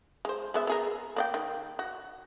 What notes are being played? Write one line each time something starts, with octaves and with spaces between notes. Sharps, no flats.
G#3 C5
G#3 B3 E5
B3 G#4 A#4
A#3 D5 G5
D#3
F#4